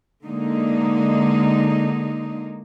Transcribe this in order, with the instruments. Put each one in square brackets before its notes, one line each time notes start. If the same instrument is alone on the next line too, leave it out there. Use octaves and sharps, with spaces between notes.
[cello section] D3 G#3 A#3 D#4